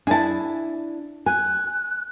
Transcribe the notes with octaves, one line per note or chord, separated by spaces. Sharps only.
D4 E4 G#4 A5
G#5 F#6